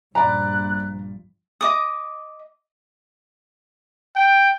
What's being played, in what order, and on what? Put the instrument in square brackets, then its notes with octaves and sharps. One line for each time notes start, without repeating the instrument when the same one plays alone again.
[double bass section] A#1 G2 F3 [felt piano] D5 B5 [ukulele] A#5 [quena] F#6
[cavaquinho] D#5 D6 D#6
[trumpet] G5